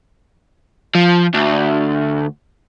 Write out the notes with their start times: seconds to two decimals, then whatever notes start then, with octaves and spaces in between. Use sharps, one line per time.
0.95 F3
1.34 D2